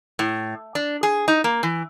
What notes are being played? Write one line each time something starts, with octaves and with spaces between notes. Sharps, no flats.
A2
D4
G#4
D#4
A#3
E3